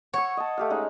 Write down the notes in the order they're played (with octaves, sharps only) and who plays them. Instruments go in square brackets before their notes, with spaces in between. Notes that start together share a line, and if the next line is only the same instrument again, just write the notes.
[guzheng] C#5 [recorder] F#5 [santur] C#6 E6
[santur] D#5 A5
A3 G4 F5
G#3 C#4 D#4